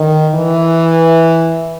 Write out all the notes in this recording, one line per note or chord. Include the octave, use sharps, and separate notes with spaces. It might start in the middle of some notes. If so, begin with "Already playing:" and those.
Already playing: D#3
E3